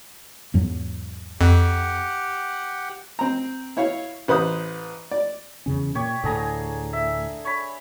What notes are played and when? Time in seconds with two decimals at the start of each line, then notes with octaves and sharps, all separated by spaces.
0.54 E2 G#2 F#3
1.41 F2 G4 F#5
3.19 C4 A#5
3.77 E4 C#5 F5
4.28 A1 B4 C5 D#6
5.11 D5
5.66 E2 C#3 C#4
5.95 A#2 G4 C#5
6.24 D2 A2 D3 G#4 A#5
6.93 E5
7.45 C#5 B5